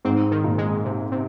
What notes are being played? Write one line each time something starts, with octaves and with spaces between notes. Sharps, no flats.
G#2 C4
D#3
A#2
G#3
C3
C3